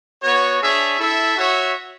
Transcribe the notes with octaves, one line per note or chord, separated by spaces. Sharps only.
B3 F#4 C#5
D4 G#4 C#5 E5
E4 A4 E5
F#4 C#5 E5